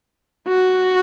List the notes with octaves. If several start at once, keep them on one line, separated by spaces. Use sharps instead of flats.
F#4